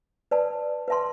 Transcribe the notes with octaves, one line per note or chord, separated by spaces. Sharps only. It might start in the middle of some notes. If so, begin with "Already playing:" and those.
B4 D5 A5
B4 E5 A5 C6